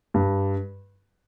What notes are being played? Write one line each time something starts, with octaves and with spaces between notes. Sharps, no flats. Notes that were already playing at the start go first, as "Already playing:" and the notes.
G2